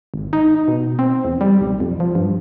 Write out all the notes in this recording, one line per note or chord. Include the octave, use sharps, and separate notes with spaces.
G#1
D#4
B2
C4
E2
G3
B1
F2
F3
G2